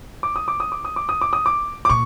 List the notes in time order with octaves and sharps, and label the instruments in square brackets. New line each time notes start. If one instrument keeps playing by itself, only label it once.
[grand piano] D6
D#6
D6
D#6
D6
D#6
D6
D#6
D6
D#6
D6
D6
[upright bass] A#2 [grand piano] C#6